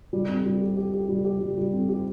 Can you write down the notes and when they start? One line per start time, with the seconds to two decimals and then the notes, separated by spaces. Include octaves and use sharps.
0.13 G3
0.29 C4
0.46 G3
0.61 G4
0.77 G4
0.93 G4
1.09 G3
1.25 G4
1.41 G3
1.58 G3
1.73 C4
1.89 G4